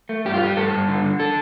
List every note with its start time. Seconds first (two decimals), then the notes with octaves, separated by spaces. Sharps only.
0.09 A3
0.25 G2 G4
0.34 F4
0.41 G2 G4
0.57 G2 A4
0.73 G2
0.88 D3
1.04 D3
1.20 A4